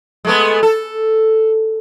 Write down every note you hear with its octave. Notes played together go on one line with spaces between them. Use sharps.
G#3 A3 B3
A4